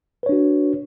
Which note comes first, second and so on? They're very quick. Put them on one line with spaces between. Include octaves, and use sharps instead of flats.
B4 C#5 D4 F#4